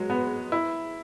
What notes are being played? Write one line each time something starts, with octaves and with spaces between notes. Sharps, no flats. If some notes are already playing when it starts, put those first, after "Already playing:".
Already playing: F#3 G#3
B3
E4